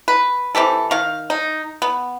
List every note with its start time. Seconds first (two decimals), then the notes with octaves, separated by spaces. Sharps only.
0.08 B4
0.55 E3 C4 G4 A4
0.91 D#3 F5
1.30 D#4
1.82 B3